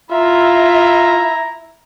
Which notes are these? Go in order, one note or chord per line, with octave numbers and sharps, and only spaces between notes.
E4 F4 E5 A#5